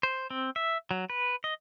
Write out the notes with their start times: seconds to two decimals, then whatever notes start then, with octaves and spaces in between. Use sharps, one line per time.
0.03 C5
0.30 C4
0.56 E5
0.91 F#3
1.10 B4
1.44 D#5